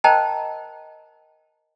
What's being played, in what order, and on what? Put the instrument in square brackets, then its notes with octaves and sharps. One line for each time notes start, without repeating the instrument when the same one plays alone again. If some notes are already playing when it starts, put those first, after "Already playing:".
[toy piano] A#4 C5 D#5 G5 A5 A#5